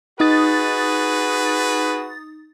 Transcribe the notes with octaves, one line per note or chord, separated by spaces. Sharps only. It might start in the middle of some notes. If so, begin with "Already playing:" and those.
D#4 F#4 G#4 B4 D#6 A6